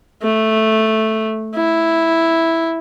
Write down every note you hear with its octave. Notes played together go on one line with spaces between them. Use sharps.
A3
E4